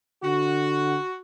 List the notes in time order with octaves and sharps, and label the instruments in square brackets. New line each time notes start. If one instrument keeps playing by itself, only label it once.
[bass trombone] D3 [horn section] F#4